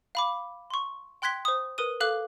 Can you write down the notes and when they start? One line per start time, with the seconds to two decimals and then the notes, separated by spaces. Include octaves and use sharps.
0.15 F5 B5 D6
0.70 C6 C#6
1.22 G5 C6 F#6 G#6 B6 G7
1.45 C5 D#6
1.78 A#4 B4 D#6 D#7
2.00 A4 F5 D6 F#6